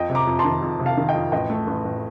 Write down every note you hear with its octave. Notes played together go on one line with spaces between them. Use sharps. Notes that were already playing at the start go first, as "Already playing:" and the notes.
Already playing: F2 D#5 G5
C3
A#5 D6
F2
A5 C6
D#3
F2
C3
F5 A5
D#3
D#5 G5
F2
A1 D#5 G5
A3
A1
A1